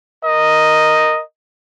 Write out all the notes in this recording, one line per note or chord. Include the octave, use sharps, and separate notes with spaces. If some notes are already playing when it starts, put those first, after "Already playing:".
A#4 D#5